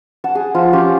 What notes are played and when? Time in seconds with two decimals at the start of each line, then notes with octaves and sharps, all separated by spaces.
0.24 F#5 A5
0.35 G#4
0.55 F3 F4
0.73 C#4 F4 G4